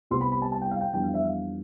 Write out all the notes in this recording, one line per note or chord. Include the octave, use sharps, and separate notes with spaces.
C2 C3 G3 B3 C6
B5
B5
A5
A5
G5
F5
G5
F2 E3 G3 B3 D4 G5
F5
E5
F5